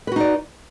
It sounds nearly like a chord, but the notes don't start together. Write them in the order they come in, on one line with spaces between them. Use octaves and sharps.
B4 F#4 D#4 D5